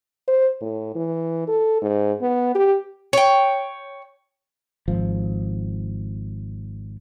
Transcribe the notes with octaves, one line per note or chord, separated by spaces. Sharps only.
C5
A2
E3
A4
G#2
B3
G4
C#5 G5
G#1 F3